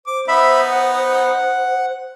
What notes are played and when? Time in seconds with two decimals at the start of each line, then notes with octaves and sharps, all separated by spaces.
0.07 C5 D6
0.28 B3 D#4 E5 B5
0.71 F#5